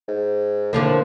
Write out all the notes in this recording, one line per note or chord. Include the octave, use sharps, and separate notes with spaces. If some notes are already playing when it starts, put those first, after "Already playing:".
G#2
A2 D3 F3 A#3